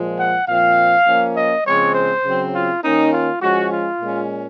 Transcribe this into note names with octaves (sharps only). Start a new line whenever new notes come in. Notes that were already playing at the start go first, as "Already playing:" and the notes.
Already playing: A#2 F3 G#3
F#5
A#2 F3 C4 F5
F3 A#3 C#4
D#5
C#3 F3 G#3 C4 C#5
C5
C#3 F#3 C4
F4
D#3 A#3 C#4 D#4
F4
F3 G#3 C#4 F#4
F4
A#2 G#3 C#4